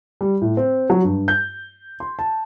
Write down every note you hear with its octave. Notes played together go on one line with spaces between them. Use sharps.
G3
A2
C4
F#3
G2
G6
C6
A5